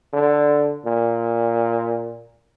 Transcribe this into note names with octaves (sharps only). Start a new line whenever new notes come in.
D3
A#2